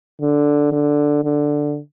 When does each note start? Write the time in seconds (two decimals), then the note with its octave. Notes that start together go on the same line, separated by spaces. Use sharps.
0.21 D3
0.72 D3
1.24 D3